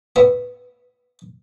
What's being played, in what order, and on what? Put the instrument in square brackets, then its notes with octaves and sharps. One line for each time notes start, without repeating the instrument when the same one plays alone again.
[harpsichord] A2 B3 C#6